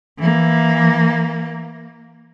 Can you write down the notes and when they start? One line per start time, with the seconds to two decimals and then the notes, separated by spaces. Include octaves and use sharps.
0.18 E3 A#3